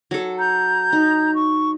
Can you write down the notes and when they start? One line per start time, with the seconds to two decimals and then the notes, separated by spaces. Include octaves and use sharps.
0.11 F#3 A4
0.38 A#5 G6
0.92 D#4
1.34 C#6